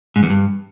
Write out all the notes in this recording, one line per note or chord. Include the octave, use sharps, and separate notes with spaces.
G#2
E2
G2